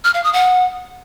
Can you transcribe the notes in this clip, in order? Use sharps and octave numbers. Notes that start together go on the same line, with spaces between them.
F6
F5
D#6
F#5